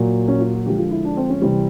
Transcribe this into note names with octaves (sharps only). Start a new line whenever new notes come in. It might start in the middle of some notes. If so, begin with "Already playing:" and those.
Already playing: A#2 F#3
C#4
F4
F#4
D3 F3 G#3 G4
F4
E4
D4
C4
C#4
C3 E3 G3 C4